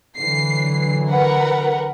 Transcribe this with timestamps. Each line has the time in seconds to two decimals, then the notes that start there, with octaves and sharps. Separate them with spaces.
0.16 D3 E3 F#3 C7
1.08 A#4 B4 F#5